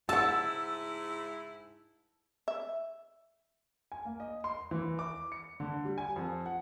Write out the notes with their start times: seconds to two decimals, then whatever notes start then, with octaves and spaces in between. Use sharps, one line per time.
0.09 G#2 C#3 E4 F#5 A5 E6
2.48 E5
3.92 G#5
4.05 A#3
4.20 D#5
4.44 C6
4.71 E3
4.99 D6
5.32 C#7
5.60 D3
5.85 G3
5.98 G#5
6.16 F2
6.46 F#5